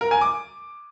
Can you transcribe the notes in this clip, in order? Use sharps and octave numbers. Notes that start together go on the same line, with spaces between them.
A#4
G#5
D6